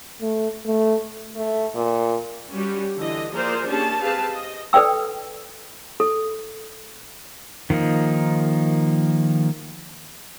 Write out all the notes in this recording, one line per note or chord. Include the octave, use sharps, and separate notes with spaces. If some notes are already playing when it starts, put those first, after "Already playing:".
A3
A3
A3
A#2
G3 C#4 F#4 G4
D3 E3 D#5
F3 A#3 G#4 A#4 C5 D5
A#3 C#4 D4 G4 G#4 A5
C4 G4 G#4 B4 F5 A5
D#5
A4 B4 D5 G5 E6
A4
D#3 F3 A#3 D#4